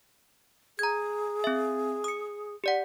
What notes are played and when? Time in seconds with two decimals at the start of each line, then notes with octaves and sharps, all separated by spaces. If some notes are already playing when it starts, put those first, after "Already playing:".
0.79 G#4 A#5 G#6
1.44 C4 E5
2.04 D#6 C#7
2.64 G4 D5 F#5